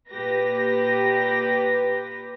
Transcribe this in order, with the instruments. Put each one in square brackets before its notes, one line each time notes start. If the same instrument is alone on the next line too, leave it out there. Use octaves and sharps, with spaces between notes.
[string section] A#2 G4 B4 A#6